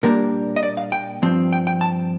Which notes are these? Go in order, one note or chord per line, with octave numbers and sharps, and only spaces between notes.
A#2 G3 A#3 D4 A#4
D#5
D5
F5
G5
G2 F3 C4
G5
G5
A5